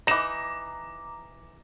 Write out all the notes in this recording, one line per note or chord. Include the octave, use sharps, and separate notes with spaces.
E3 D#4 A#5 D6 A#6 E7